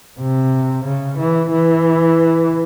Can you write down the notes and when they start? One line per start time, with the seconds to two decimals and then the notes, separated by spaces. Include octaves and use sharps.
0.20 C3
0.84 C#3
1.18 E3
1.50 E3